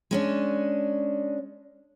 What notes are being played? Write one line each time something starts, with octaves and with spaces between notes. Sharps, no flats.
G#3 C#4 D4